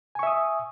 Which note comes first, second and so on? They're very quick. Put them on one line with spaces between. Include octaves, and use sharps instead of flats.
G#5 C#6 E5 D#6